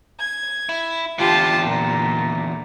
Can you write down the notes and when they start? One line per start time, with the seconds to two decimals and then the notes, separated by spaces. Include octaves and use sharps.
0.19 G#6
0.69 E4
1.19 E2 D3 F4 G4 A5
1.66 A#2